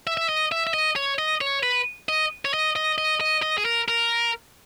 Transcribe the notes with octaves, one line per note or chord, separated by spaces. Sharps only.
E5
E5
D#5
E5
E5
D#5
C#5
D#5
C#5
B4
D#5
C#5
D#5
D#5
D#5
D#5
D#5
G#4
A#4
A#4